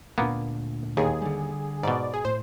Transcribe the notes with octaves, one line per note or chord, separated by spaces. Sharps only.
D2 A#2 A#3 B3 D4
D#2 G#4
D3 G3
G#2 B2 D5
G#4
A2 C5